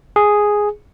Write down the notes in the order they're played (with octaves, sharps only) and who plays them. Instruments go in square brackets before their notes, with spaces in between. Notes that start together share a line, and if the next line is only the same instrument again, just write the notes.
[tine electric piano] G#4